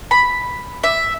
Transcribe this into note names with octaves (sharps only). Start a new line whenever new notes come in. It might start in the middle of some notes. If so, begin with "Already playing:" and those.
B5
E5